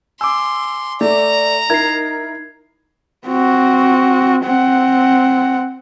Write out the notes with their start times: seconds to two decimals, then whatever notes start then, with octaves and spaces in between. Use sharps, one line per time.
0.21 G#5 C6 D6 E6
1.01 A3 D5 A#5
1.70 D#4 E4 A#4 G#6 C7
3.27 C4 F#4
4.44 C4 F#5